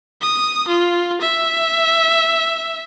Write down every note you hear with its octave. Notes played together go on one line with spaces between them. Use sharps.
D#6
F4
E5